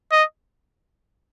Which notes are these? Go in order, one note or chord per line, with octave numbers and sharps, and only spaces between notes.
D#5